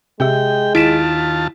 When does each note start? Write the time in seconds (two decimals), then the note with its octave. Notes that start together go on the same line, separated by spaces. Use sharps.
0.20 C3 G#3 G4 E5 G5
0.75 D#2 E4 F4 A5 B6 D7 E7